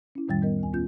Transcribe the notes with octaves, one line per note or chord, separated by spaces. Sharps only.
C#4 E4
F2 A2 D#3 G3 G5 A6
G3 B3 A#4 D#5
D2 G#5
B3 C#4 F4 G6